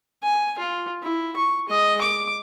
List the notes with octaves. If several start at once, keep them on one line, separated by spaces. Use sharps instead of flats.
G#5
F4
E4
C#6
G#3 D#5
D6